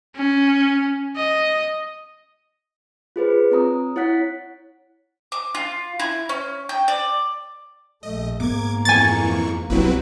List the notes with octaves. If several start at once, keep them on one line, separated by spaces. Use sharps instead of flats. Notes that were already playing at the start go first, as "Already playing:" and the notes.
C#4
D#5
F4 G#4 B4 C5
C4 C#5 A#5 D#6
E4 C#5 F#5 F#6 B6
D6
F4
E4
C#4
G5
D5
A#1 A3 D#5
G#2 A#3 B3 D6 G#6
F2 E3 G#5 C#6 A6
B1 G2 F#3 G3 C4 E4 B4